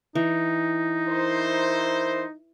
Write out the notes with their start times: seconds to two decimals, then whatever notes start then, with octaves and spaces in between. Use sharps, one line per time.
0.15 E3 D#4
1.07 E4 A#4 C5